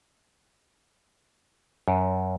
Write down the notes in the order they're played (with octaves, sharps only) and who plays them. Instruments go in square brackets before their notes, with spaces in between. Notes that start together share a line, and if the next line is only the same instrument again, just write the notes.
[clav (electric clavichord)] F#2